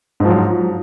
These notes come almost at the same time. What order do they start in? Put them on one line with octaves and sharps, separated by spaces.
G#2 F3 F#3